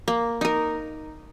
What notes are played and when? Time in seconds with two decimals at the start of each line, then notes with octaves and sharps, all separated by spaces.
0.08 A#3
0.41 D#4 A#4